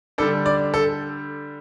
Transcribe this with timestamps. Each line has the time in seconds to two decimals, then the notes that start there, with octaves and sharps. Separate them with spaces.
0.18 D3 G3 D4 A4
0.46 D5
0.74 A4